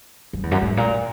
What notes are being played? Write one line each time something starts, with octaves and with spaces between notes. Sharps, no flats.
F#2
E2
F#2
G#2
A#2